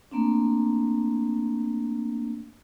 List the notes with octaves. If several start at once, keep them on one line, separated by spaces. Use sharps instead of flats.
A3 A#3 C4 D4